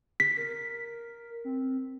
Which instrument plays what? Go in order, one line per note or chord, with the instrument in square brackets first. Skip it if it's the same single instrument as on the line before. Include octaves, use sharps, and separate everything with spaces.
[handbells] B6
[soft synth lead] A#4
C4